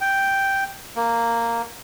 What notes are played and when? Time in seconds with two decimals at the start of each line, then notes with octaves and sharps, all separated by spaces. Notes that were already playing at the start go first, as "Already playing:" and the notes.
0.01 G5
0.96 A#3